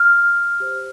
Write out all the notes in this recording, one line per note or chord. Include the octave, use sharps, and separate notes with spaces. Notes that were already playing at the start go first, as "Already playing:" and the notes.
Already playing: F6
G4 C5